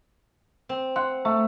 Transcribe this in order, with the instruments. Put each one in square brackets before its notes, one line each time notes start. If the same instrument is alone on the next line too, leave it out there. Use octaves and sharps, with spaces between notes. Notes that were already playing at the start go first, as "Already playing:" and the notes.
[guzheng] C4
[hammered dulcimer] F#5 [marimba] C6
[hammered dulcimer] A3